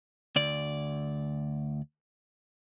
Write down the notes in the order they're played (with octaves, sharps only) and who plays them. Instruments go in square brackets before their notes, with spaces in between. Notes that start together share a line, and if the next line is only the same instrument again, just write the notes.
[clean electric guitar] D2 D5